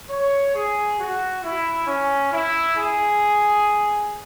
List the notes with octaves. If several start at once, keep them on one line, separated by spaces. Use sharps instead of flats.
C#5
G#4
F#4
E4
C#4
E4
G#4